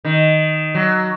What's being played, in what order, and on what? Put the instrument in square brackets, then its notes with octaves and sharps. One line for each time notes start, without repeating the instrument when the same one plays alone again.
[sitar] D#3
F#3